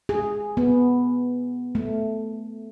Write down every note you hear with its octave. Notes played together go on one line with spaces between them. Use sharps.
G#4
B3
A3